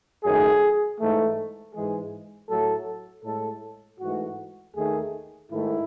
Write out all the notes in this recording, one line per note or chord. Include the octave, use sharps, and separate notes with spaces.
F#2 D#3 A3 G#4
G#2 E3 A3
G#2 E3 G#3 G#4
A2 F#3 A3 A4
A2 G#3 A4
G#2 E3 A3 F#4
D#2 D#3 A3 G#4
G#2 D#3 A3 E4